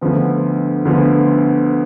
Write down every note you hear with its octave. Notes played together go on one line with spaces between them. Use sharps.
D2 D3 F3 B3
D2 D3 F3 B3